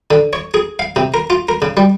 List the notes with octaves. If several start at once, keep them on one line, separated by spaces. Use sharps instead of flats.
D3
C#5
G#4
F5
C3
A#4
F4
A#4
C#3
G3